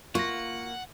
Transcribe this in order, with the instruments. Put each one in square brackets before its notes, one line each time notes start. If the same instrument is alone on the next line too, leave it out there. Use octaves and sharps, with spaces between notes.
[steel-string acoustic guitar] A#3 [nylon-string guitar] F4 [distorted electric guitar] F#5 [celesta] C#6 A#6